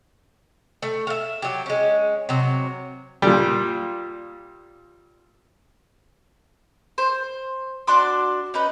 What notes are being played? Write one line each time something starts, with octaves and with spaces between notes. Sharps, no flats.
A3
E5 F5
F#3 G4
G#3 C#4
C3 F#3
A#2 G3
C5
D4 F#4 C6 D6
C#4 D#4 B4